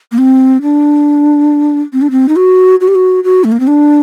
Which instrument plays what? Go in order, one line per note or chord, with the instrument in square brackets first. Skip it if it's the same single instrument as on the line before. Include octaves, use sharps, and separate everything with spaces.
[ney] A#3
C4
D4
C4
D4
C4
D#4
F#4
F#4
G4
F#4
F#4
A3
A#3
C4
D4